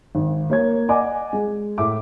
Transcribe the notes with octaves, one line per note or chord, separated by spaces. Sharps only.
G#1
A#3 C#5 G#6
D5 D#5 F#5 G#5 D6
G#3
A2 E5 D6